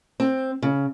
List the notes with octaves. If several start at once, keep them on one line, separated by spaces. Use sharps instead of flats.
C4
C#3